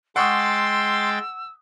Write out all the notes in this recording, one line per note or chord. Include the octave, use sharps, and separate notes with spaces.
G#3 F#5 G5 C6 C#6 D#6 E6 A6